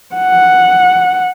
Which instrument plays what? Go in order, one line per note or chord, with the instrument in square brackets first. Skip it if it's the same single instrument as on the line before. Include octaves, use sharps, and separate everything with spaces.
[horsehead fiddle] F#5